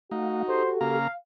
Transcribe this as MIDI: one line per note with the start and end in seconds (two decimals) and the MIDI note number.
0.11 0.43 57
0.11 0.63 63
0.11 0.98 66
0.11 0.43 77
0.11 0.43 78
0.48 0.99 67
0.48 0.99 69
0.48 0.71 72
0.81 1.08 49
0.81 1.08 58
0.81 1.12 77
0.81 1.08 82